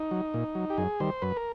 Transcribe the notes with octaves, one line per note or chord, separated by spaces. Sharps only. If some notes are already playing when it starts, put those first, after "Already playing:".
Already playing: D#4
F#3
A#2
F#3
G4
F#2 G#4
D#3 G3 C5
F#2 B4
A#4